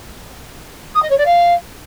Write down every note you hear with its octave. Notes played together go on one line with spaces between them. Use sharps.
D#6
D#5
C#5
D5
F5